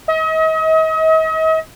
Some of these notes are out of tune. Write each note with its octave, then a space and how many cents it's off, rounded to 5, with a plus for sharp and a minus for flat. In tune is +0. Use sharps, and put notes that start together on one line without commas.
D#5 +40